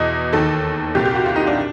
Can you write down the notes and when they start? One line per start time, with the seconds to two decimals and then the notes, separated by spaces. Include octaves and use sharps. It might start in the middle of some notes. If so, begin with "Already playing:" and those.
Already playing: E2 B2 D#5
0.33 D#2 D#3 A4
0.95 C2 A#2 G4
1.05 G4
1.15 F#4
1.26 F4
1.36 D#4
1.47 D4